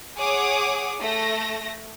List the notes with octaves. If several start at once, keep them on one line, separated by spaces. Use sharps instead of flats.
G#4 C#5 F#5 D6 D#6
A3 A#6